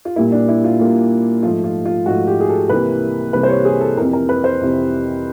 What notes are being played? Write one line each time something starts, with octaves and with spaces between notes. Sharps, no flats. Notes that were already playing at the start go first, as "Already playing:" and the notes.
F4
A#2 G3 A#3 E4
D4
E4
F4
A#2 G3 A#3
G#2 F3 A3 F4
F4
F4
G#2 F3 A3 F#4
G4
G#4
A4
C2 C3 E3 G3 A#3 B4
C2 C3 E3 G3 A#3 B4
C5
C#5
G#4
A4
F2 C3 E3 A#4
A#4
B4
C5
F2 C3 E3